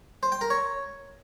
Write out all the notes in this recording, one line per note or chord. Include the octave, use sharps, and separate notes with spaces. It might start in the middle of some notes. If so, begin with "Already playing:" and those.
C5
G5
A#4
C#5